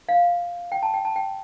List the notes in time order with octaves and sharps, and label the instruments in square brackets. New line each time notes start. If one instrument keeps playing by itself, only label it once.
[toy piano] F5
G5
A5
G5
A5
G5